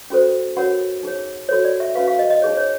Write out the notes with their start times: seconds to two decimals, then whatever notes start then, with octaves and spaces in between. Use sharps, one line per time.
0.10 C#4 F#4 A4 C5
0.57 C#4 F#4 A#4 C#5 F#5
1.03 D#4 G#4 C#5
1.49 F#4 A4 C#5
1.65 D5
1.80 E5
1.95 C#4 F#4 B4 F5
2.07 F5
2.19 D#5
2.30 D#5
2.42 D#4 G#4 C#5
2.57 C#5